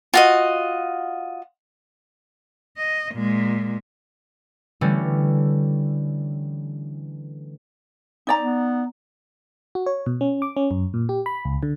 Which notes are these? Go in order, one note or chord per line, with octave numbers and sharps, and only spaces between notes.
F4 F#4 D#5
D#5
A#2 G#3
D3 E3 G3 A3 C#4
D#4 D5 A#5
B3
F#4
C#5
B2
C#4
D6
C#4
F#2
A#2
G4
B5
C#2
D3